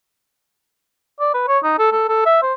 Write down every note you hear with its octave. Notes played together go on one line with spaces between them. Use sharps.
D5
B4
C#5
D#4
A4
A4
A4
E5
C5